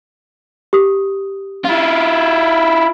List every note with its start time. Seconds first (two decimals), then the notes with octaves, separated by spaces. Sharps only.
0.73 G4 D#6
1.65 E4 F4